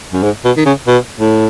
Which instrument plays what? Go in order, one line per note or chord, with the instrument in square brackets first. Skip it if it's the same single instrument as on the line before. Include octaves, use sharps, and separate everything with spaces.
[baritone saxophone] F#2
G#2
B2
D#3
C#3
B2
A2